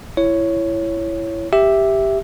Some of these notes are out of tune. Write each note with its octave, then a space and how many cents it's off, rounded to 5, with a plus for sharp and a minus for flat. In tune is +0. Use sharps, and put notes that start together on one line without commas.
E4 +20 C#5 +0
G4 +0 E5 +0